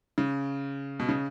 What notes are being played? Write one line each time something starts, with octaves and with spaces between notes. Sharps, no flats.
C#3
B2
C#3